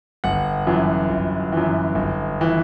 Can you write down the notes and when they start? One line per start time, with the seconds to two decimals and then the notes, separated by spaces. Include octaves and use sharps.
0.24 G1 F#5
0.67 F#2 E3
1.09 G1
1.52 F#2 E3
1.95 G1
2.41 E3